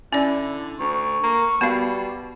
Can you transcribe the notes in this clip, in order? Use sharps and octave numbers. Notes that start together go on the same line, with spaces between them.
D3 C#4 E4 D5
D2 C#6
A#3
B2 G3 B3 F5